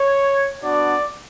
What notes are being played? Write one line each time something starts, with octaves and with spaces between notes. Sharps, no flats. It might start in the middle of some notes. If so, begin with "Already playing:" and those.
Already playing: C#5
B3 D4 F#4 D5